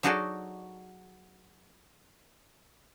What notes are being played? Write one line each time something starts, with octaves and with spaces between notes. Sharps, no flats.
F#3 D#4 F#4 G#4 A4 D5